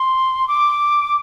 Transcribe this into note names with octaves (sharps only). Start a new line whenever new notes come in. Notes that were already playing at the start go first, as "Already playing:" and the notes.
Already playing: C6
D6